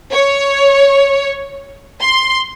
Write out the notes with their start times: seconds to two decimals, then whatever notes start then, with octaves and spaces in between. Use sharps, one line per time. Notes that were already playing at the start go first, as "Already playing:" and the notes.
0.13 C#5
2.00 C6